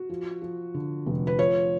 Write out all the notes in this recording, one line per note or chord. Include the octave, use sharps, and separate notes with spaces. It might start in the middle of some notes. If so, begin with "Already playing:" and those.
Already playing: F#4
F3
F3
D3
F1
B4
F3 C#5